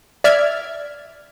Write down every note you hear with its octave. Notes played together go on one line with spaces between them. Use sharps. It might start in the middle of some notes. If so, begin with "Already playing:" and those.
D5 E5 F6 G#6